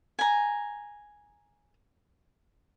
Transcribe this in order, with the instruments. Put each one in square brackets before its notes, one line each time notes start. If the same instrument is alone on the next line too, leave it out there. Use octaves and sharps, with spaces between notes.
[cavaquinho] G#5 A#5